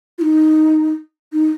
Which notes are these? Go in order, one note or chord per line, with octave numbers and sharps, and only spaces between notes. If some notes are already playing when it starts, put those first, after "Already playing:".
F4
D#4
D#4